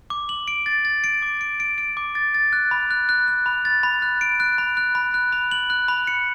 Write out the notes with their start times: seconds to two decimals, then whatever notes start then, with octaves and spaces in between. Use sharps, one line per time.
0.10 D6
0.29 F#7
0.48 D7
0.66 A6
0.85 A6
1.04 D7
1.22 D6
1.41 D7
1.60 D7
1.78 D7
1.97 D6
2.15 A6
2.34 A6
2.53 F#6
2.71 B5
2.91 F#6
3.09 F#6
3.28 F#6
3.46 B5
3.65 A6
3.83 B5
4.02 F#6
4.21 D7
4.40 F#6
4.58 B5
4.77 F#6
4.95 B5
5.14 F#6
5.33 B5
5.51 F#7
5.70 F#6
5.88 B5
6.07 C#7